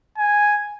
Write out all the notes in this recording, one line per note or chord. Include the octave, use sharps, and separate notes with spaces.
G#5